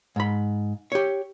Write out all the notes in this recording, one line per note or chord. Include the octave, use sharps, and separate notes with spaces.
G#2 B5
G4 C#5